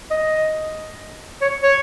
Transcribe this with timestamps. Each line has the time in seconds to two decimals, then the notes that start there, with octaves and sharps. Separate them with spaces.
0.11 D#5
1.41 C#5
1.63 C#5